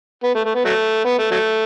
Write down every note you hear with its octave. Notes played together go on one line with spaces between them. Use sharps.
B3
A3
A3
B3
F#3 A3
B3
A3
F#3 A3